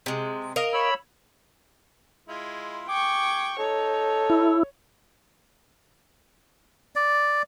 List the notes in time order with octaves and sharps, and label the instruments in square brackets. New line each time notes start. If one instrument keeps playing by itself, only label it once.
[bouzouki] C3 G#3
A#4 D#5 F5
[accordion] C#5 B5 E6
[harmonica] G#3 E4 F4
[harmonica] G#4 D6 [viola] G5 C#6
[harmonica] D#4 [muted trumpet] A4 [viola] C#5
[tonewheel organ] E4
[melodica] D5